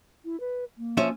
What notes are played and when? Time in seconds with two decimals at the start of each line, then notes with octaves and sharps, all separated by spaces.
0.25 E4
0.40 B4
0.78 A#3
0.97 F3 C#4 E5